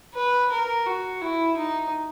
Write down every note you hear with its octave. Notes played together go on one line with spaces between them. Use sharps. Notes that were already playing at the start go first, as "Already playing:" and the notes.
B4
A#4
F#4
E4
D#4